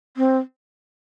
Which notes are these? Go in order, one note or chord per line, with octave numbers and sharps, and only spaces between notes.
C4